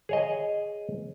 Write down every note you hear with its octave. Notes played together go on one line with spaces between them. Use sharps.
G#4 C#5 D#5